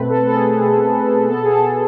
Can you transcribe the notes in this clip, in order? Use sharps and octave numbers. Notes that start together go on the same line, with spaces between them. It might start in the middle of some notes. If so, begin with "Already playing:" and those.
Already playing: B2 A3 C4 B4
A4
A4
G#4
B2 A3 C4 G#4
B2 B3 A4
G#4
A4